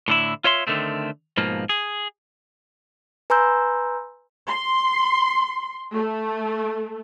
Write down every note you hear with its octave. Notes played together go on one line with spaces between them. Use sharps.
A2 D3 E4
F4 C#5 E5 C6
D3 D#3 A3 C4
G#2 B2 F3 A#3
G#4
B4 G#5 A#5 C6 E6 G6
C6
A3